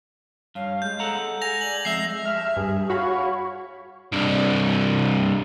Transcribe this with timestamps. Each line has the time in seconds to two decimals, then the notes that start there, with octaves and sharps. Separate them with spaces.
0.55 G2 C#5 F5
0.82 G#3 G6
1.00 A4 F#5 A#5
1.42 G#5 A#6 F7
1.61 D5 F#7
1.85 F2 G#3 E5 A#6 C7
2.25 E5 F6
2.57 G2 G#4
2.90 F#4 C#5 F5 B5
4.12 C2 G2